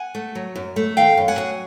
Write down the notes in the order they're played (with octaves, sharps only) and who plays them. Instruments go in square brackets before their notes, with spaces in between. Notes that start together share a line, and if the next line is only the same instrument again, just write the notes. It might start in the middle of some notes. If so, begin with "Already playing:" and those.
Already playing: [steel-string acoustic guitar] F#5 G#5
A3
F#3
F#2
A3
D#3 F5 G5
F#2
F#5 G#5
F#3